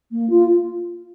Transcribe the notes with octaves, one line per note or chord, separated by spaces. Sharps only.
A#3
F4